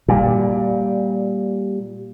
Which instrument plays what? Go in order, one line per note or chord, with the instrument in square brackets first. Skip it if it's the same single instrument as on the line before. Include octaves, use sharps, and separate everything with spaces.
[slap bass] A#2 G3